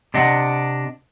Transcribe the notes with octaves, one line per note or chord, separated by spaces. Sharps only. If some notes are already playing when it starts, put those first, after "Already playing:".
C3 D4 D#5 F#5